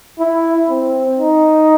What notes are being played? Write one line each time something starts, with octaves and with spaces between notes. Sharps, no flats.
E4
C4
D#4